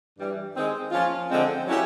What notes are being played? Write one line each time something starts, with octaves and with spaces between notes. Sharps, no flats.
G2 E3 G3
D#3 G#3 C4 D#4
F3 A#3 C#4 F4
D3 F3 G#3 C4
F#3 A3 C#4 E4 G4